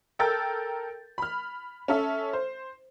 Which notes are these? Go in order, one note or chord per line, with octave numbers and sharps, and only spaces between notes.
A4 A#4 G5 E6 G6 A6
B5 F6
C#4 A4 E5
C5